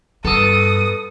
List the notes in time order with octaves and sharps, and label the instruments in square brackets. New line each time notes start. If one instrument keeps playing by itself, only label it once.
[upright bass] G2 [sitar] B2 A4 [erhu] D#6